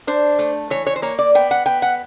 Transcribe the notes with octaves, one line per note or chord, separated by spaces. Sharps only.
D4 C5
A3
E3 C#5
C#5
C5
A#3 C#5
D5
B3 G5
F#5
B3 G5
F#5